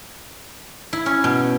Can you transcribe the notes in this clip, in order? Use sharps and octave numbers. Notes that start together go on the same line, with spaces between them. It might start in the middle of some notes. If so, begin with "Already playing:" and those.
E4
C#4
B2